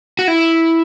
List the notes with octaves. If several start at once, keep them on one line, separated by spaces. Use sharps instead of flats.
F#4
E4